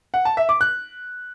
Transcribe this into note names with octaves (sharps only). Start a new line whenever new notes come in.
F#5
A5
E5
D6
F#6